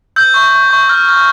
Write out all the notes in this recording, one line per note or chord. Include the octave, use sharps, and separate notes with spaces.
E6 G6
C#6
C#6
C#6
F6
F6